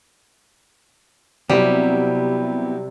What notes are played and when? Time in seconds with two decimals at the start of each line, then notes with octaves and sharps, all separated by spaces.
1.49 C3 F#3 G3 B3 C4 E4 G4